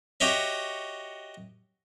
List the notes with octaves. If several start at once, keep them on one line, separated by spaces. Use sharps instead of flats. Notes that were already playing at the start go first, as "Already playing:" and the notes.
F#4 G4 C#5 D#5 E5